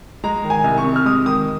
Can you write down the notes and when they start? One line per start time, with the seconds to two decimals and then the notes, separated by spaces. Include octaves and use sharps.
0.24 G#3 A#5
0.44 D#3
0.50 G#5
0.64 C2
0.78 C#6
0.84 C3
0.96 F6
1.06 G#3 D#6
1.26 D#3 D#6